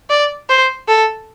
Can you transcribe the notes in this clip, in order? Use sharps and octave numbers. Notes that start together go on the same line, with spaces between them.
D5
C5
A4